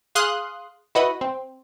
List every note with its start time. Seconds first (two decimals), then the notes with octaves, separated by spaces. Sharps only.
0.15 G#4 F5 C6 D#6 F#6
0.95 E4 F#4 B4 D#5
1.21 C4